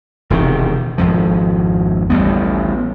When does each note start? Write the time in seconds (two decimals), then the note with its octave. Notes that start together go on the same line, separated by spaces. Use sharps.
0.30 E1 C3 D#3
0.98 G#1 F2 F3
2.10 A1 D2 G3 B3